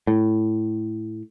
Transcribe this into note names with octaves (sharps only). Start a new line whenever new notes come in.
A2